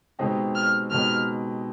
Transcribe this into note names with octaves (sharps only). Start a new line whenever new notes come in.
B2 G#3 C4 D#4 G4
F6
B2 G#3 C4 D#4 G4 F6